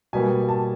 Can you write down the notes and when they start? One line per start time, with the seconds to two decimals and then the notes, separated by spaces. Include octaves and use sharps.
0.13 B2 G3 A#3 G#5
0.49 A5